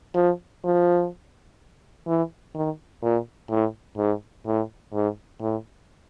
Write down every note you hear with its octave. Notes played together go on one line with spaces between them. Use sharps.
F3
F3
E3
D#3
A#2
A2
G#2
A2
G#2
A2